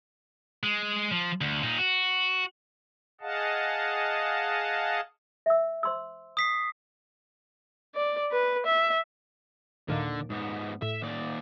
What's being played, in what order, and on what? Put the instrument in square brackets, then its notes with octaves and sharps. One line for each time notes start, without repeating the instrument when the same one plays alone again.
[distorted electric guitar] G#3
F3
D2
A#2 D#4
F#4
[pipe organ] G#4 D#5 F5 F#5 A5
[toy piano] E5 E6
C5 C6 E6
[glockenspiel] D#6 B6 C7
[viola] D5
B4
E5
[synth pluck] D#2 A#2 D#3 [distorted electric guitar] D3
[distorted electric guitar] G#2 B3
[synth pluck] A2 [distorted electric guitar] E5
[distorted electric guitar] D#2 D5